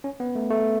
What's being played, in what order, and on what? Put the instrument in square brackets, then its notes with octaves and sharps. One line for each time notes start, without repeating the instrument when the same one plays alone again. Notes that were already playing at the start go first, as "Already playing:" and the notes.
[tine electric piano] C#4
B3
A3
A3